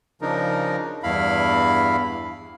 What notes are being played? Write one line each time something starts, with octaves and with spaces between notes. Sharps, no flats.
C#3 F3 D4 D#4 A#4
E2 G2 E4 F5 B5